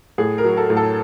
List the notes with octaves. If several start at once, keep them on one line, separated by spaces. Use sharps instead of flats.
A2 G#4
A#4
F#3
A4
A2
A4